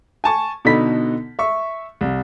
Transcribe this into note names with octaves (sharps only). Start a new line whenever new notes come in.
G#5 A5 C#6
B2 D3 D#4 A4 B5 B6
E5 C#6
C2